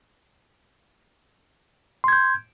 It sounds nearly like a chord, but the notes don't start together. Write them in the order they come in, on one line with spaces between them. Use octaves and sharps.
C6 G#6 G6